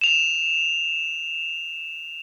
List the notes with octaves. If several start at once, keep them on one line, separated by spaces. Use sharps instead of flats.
E7 F7